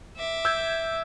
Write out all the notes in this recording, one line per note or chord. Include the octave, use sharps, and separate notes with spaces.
E5 D6
E6 G6 G#6